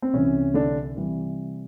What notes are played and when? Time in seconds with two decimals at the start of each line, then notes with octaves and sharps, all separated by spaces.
0.02 C4
0.13 C2 C3 E3 C#4
0.54 D3 D4
0.97 C3 E3 G3